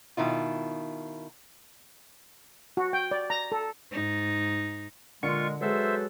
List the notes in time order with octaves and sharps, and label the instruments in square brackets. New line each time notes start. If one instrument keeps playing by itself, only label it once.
[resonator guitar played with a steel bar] B2 D#3 E4 F4
[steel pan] F#4
G5
D5
A#5
A4
[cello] G#2 D#4
[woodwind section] A#2 G#3 [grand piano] D3 C#7 [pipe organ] F4 C#6
[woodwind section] F#3 A4 B4 [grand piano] G#3 [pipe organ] C5 E5